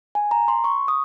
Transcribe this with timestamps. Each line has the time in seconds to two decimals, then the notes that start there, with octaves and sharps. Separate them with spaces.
0.15 G#5
0.31 A#5
0.48 C6
0.64 C#6
0.88 D#6